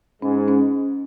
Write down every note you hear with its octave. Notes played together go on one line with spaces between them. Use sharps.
G#2 G#3 C#4
C#4